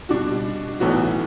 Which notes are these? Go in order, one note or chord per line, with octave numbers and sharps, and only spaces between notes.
B2 G3 D4 F#4
B1 A2 E3 B3 F#4